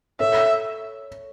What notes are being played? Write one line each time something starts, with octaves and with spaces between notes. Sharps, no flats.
A4 C#5 E5